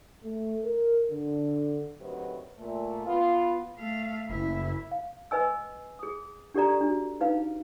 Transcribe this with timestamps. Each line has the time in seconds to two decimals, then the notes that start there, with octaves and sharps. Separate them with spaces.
0.24 A3
0.64 A#4
1.11 D3
2.00 D2 C3 D#3 F#3 F#4 B4
2.58 A#2 A3
3.06 B3 F4
3.78 A3 F5
4.30 F#1 E4
4.91 F5
5.31 B4 D#5 G#5 E6
5.99 G#4 D#6
6.54 D4 G4 A4 D5 A#5
6.81 D4 F#4
7.20 D#4 B4 F5